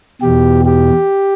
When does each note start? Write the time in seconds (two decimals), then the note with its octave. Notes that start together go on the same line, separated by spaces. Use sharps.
0.22 E2 B2 G4
0.66 G4